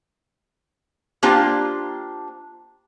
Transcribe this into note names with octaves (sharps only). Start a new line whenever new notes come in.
A#3 D4 F4 G4 C5